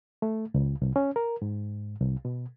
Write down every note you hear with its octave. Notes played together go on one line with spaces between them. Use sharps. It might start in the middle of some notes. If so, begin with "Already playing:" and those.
A3
C#2
C2
C#4
A#4
G#2
C2
B2